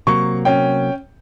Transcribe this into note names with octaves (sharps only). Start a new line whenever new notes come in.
C3 F#3 A#3 C#6
C#4 G5